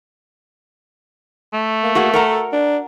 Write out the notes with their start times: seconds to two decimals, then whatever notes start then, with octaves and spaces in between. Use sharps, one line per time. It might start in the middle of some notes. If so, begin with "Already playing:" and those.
1.53 A3
1.83 A#3
1.95 A#3 F#4 G#4 F#5
2.14 A4 A#4 F#5 A#5
2.53 D4